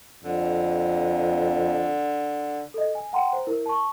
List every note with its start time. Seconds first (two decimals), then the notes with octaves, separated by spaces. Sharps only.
0.24 F2 D3
2.74 A4 D#5
2.95 G#5
3.13 F#5 G5 A#5 C6
3.33 C5
3.47 E4 A#4
3.66 A5 C#6